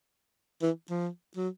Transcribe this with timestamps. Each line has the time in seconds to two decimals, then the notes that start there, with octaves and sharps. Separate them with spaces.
0.62 E3
0.90 F3
1.37 F#3